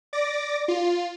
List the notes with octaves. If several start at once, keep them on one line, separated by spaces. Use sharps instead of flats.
D5 D6 A#6
F4